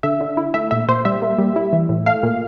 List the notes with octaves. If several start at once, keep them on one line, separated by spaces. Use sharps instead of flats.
D3 E5
D3
E4
A3 E5
A#2 E5
A#2 C5
G3 E5
A#3
G3
E4
E3
A2
A3 F5
A#2